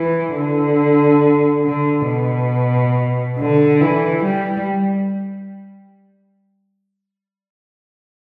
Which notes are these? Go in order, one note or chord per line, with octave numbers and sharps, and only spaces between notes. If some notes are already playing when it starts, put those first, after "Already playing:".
Already playing: E3
D3
D3
B2
D3
E3
G3